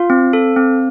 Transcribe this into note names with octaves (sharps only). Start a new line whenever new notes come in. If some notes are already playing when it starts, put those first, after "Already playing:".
Already playing: F4 F5
C4
A4
C4